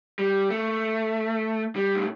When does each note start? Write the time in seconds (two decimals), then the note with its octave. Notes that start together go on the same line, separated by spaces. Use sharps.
0.19 G3
0.50 A3
1.76 G3
1.95 A2